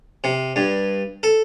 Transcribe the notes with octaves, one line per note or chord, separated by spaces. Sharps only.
C3
G2
A4